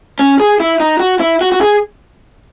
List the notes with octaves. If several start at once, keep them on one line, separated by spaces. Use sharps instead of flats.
C#4
G#4
E4
D#4
F#4
E4
F#4
F#4
G#4